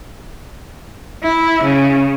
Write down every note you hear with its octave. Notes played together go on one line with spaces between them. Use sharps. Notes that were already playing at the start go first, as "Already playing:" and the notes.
E4
C#3